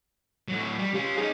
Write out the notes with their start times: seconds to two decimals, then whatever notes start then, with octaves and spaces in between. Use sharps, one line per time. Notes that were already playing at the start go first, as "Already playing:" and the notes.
0.48 A2 F#3 C#6
0.79 G3
0.94 C#4 F4 G4
1.17 C#4 D#4 G#4